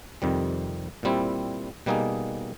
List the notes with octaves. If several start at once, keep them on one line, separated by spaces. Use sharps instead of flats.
F2 C3 D#3 G3
A#2 G3 C4 E4
B2 G3 A#3 D#4 G#4